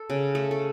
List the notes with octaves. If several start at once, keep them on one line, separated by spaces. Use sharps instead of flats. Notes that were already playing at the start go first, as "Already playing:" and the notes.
Already playing: A4
C#3
A3
A4